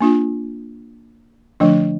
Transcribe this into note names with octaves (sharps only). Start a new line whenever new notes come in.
A#3 D4 F4
D3 F3 A3 D4